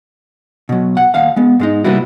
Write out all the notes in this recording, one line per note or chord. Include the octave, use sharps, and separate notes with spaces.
B2 F#3
F#5
D#2 F5 F#5
G#3 B3
G#2 G#3 D#4
C3 G3 A#3 B3 E4 F#4